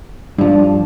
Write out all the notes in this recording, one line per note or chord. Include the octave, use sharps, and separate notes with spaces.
G2 F3 D4